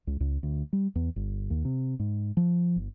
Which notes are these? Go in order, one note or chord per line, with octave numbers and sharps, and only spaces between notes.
C#2
C#2
D2
G3
E2
G1
D#2
C3
G#2
F3
G1